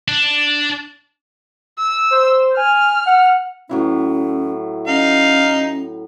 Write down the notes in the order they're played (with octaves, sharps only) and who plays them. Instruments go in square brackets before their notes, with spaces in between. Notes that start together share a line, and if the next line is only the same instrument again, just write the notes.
[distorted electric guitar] D4
[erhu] E6
[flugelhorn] C5
[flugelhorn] G#5 [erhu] F6
[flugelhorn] F#5
[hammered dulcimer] A2 F#3 E4 [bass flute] C#4
[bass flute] C#4 [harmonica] D#4 F5